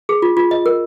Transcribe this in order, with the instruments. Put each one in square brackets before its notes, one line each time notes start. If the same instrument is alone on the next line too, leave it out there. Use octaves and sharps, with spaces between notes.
[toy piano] G#4
F4
F4
D#5
A#4